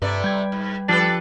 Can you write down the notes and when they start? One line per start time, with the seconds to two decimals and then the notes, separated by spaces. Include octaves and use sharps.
0.02 G2 C3 A3 B4 D5 D6
0.24 G3 G5 G#6
0.52 G#2
0.88 F3 D4 G4 A4 B4 A6